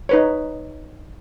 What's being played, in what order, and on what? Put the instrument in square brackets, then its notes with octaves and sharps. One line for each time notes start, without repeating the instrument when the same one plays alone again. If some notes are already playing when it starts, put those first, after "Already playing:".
[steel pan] D#4 B4 C#5